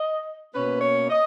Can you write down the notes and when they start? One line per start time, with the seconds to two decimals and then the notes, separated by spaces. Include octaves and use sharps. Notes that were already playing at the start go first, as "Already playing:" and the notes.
Already playing: D#5
0.54 B2 A#3 C#4 B4
0.81 C#5
1.09 D#5